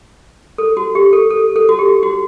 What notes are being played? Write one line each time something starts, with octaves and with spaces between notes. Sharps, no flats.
A4
F#4
G4
A4
A4
A4
F#4
G4
F#4